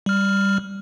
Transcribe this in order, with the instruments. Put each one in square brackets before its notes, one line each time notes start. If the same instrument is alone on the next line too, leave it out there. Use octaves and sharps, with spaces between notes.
[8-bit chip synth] G3 F6